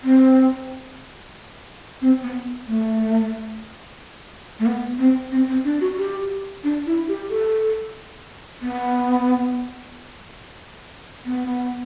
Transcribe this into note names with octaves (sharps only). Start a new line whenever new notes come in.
C4
C4
B3
A3
A3
B3
C4
C4
C4
D4
F#4
G4
D4
E4
G4
A4
B3
B3